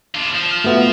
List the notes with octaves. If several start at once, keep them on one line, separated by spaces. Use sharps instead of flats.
D4 F4
F3
F6 F7
A3 B3 F4 F#4 B4 E5